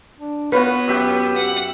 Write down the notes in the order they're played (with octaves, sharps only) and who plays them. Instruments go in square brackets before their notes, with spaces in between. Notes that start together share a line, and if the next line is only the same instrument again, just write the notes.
[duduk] D4
[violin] B3 [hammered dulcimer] F4 F#4 [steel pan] B4 [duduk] C#5
[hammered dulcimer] F#2 E5 G5 [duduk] G4
[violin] F#5